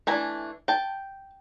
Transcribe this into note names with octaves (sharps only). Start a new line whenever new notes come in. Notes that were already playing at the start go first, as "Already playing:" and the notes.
E3 A3 D4 G#5 A#5
G5 A5